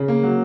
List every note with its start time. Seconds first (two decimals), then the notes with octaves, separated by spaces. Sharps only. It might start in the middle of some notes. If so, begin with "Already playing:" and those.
Already playing: C#3
0.08 A#3
0.23 F#3